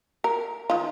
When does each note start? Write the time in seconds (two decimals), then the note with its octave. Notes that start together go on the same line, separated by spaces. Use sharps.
0.24 A#4
0.70 D#3 F4